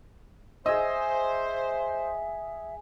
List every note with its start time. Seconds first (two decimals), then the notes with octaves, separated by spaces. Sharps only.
0.66 G#4 C5 D#5 E5 E6